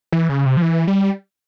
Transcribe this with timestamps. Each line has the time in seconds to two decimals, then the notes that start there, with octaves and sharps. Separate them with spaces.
0.12 E3
0.29 C#3
0.46 C3
0.57 F3
0.62 E3
0.87 G3